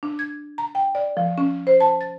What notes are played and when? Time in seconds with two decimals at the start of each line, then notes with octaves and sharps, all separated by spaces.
0.03 D4
0.19 G#6
0.58 A#5
0.75 G5
0.95 D5
1.17 F3
1.38 C#4
1.67 C5
1.81 A5
2.01 A6